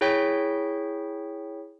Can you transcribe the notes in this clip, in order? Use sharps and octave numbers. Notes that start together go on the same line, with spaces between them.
E4 G#4 C#5 G5 G6 B6